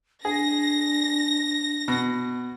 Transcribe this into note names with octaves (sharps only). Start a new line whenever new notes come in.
D4 G#4 A#6
B2